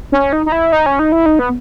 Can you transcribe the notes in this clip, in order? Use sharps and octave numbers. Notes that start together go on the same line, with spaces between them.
C#4
D#4
D#4
E4
D#4
C#4
D#4
E4
D#4
B3